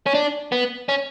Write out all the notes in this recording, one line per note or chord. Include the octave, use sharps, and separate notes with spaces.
C#4
D4
B3
C#4